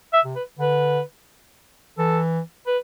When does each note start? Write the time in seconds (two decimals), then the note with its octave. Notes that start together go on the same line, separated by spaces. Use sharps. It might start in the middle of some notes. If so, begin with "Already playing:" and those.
0.13 E5
0.24 C3
0.36 B4
0.59 D3 B4
1.98 E3 A4
2.67 B4